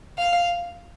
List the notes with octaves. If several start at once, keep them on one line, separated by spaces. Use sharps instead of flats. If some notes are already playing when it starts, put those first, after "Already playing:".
F5